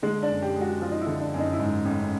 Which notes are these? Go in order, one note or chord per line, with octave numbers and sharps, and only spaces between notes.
D3 G#3
D4
F#2
G4
G#3
F#4
F3 F4
D#4
E4
D3
D4
F#2
D#4
E4
G#2 D#4
A1